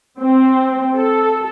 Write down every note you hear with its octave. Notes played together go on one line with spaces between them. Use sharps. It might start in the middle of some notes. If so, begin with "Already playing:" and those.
C4
A4